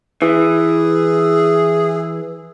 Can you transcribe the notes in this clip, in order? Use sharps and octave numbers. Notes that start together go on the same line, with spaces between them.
E3 G#4